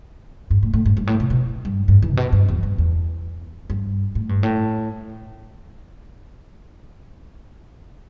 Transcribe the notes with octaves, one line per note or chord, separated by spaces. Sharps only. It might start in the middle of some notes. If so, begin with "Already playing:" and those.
G2
A2
A2
G2
G2
A2
B2
B2
G2
G2
E3
A2
B2
G2
E2
G2
E2
G2
A2
G2
A2